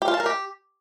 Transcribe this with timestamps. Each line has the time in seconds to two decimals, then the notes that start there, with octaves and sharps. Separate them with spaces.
0.02 G4
0.08 F4
0.14 A5
0.20 A#4
0.26 G4